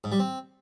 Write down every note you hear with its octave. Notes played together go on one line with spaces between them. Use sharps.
G#2
G3
C4